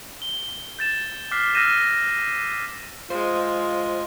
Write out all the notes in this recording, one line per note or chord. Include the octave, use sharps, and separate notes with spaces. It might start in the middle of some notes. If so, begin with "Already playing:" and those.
G7
G6 A6 E7
D6 F6 F#6 B6 C7
E6 F6 G6 A#6 D#7 E7
G#3 F4 C5